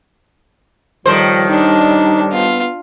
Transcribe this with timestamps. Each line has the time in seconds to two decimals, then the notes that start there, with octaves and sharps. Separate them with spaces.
1.06 A2 D#3 F3 G3 C5
1.50 D4 D#4
2.33 B3 F4